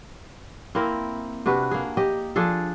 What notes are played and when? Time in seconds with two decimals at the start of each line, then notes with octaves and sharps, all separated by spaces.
0.75 A#3 C4 E4 A#4
1.46 C3 D4 F#4 B4
1.71 A#3 G#4
1.97 G4 D#5
2.36 F3 D4 G#4 A4